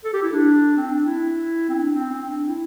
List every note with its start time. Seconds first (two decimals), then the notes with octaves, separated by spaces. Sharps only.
0.04 A4
0.14 G4
0.23 E4
0.33 D4
0.77 C4
0.91 D4
1.05 E4
1.69 C4
1.75 D4
1.94 C4
2.12 C4
2.29 D4
2.48 E4